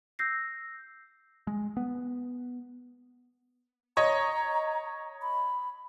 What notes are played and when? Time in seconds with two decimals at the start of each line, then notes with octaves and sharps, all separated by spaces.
0.19 E6 G6 A#6 C7
1.47 G#3
1.77 B3
3.97 C#5 D#5 A#5
5.22 B5